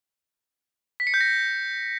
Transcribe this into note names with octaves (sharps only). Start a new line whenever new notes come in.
B6
C#7
G6
A#6